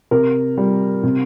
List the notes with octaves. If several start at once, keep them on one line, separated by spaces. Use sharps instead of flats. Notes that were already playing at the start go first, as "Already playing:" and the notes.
C3 A#4
G3
C3